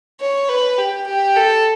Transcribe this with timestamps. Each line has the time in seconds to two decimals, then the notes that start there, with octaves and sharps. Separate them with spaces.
0.20 C#5
0.49 B4
0.78 G4
1.06 G4
1.36 A4